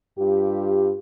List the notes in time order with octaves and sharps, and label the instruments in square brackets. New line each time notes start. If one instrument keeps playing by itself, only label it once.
[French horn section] G2 F4 G4